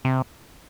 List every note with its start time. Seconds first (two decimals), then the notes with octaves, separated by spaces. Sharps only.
0.05 C3